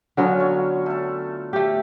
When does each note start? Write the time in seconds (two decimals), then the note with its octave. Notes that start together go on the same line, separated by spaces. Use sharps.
0.17 D3 F#3 B3 C#4 F4 A4
0.40 C#5
0.86 A3 A5
1.53 A3 G4 G5